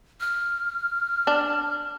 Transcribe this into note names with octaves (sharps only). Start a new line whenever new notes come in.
F6
D4